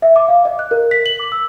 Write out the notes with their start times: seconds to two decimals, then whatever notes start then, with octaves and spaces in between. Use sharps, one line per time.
0.02 E5
0.16 D6
0.28 F5
0.45 D#5
0.59 F#6
0.71 A#4
0.91 B6
1.06 F#7
1.19 D6
1.32 E6